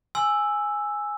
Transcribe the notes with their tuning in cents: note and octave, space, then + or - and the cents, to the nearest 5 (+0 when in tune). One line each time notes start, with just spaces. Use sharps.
G#5 +0 C6 +0 E6 +0